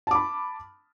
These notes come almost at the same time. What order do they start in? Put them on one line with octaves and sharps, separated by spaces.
A5 D6 B5